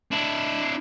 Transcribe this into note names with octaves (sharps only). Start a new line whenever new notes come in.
D4 E4